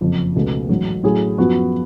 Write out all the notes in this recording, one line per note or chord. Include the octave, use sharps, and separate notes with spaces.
F#1 F2 F3
C#2 B2 A3
A1 G#2 F#3
A2 F#3 C#4 G#4
F#2 F3 B3 F#4